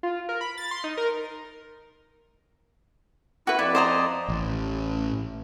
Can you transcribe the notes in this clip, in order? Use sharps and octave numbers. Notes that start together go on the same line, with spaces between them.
F4
A#4
B5
A6
C6
D#4
A#4
E4 F#4 B4
F2 E4 D5
C5 D#5 A#5
A1